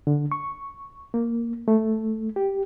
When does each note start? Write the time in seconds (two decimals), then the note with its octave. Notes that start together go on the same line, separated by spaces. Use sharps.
0.07 D3
0.32 C#6
1.14 A#3
1.68 A3
2.36 G4